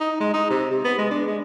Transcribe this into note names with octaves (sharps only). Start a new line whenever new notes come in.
D#4
G#3
D#4
C3
C3
B3
G#3
D4
G#3